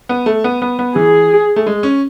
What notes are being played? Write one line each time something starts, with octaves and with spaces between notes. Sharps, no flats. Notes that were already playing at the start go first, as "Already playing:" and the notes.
B3
A3
B3
B3
B3
E3 G#4
A3
G#3
C#4